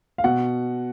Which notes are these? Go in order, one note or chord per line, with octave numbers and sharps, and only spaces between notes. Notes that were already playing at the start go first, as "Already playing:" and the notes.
F5
B2 F#5